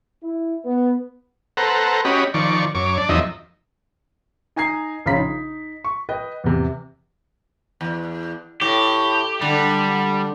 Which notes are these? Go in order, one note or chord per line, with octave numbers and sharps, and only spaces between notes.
E4
B3
A4 B4 C5 F#5 A#5
C#4 F#4 G4 D#5 B5
D#3 F3 D5 C#6
F#2 C#5 D6
D4 D5
E2 F3 F#3 D#4 D#5 E5
D#4 G#5 A#5 G#6 C7
A#1 C#3 F4 A#5 B5 B6
D#4
C#6
B4 D#5 G5
E2 C3
E2
A2 G4
D3 G3